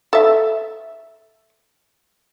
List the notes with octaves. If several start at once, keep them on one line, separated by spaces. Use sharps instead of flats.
A4 E5